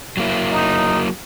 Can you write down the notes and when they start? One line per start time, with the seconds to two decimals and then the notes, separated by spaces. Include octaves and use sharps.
0.17 F#3 A#3 E4
0.52 D#4